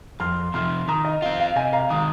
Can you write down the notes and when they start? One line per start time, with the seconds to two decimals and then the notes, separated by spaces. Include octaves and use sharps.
0.20 F2 C6 F6
0.54 C3 F3 C6 F6
0.88 D#3 A#5 D#6
1.05 D#5
1.22 C4 F4 F5
1.40 F5
1.56 C3 D#5 G#5
1.73 F5 A#5
1.90 D#3 G#3 A#5 D#6